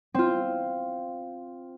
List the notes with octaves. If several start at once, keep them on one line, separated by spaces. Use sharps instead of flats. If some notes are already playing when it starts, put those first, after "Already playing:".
C4 F4